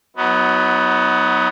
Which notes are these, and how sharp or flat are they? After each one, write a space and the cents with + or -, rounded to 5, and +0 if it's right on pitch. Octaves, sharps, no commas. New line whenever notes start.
F#3 +0 B3 +10 D#4 +40